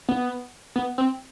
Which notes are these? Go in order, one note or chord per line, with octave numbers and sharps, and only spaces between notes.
B3
B3
C4